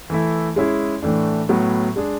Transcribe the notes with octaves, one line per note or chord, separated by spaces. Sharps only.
E3 A3 E4
G#3 C#4 E4 G#4
A2 E3 A3 D4
A2 F#3 B3
G#3 D4 G#4